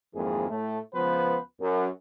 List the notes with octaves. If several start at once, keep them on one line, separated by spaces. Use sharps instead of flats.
G#1 F2 G#2 E3 A#3 G#4
A2 A3
C#2 F3 B3 B4 C5
F#2